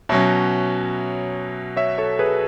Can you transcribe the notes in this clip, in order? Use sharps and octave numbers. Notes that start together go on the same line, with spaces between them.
B2 F#3 C#4 C#5 E5
C#5 E5
A4 C#5
G#4 B4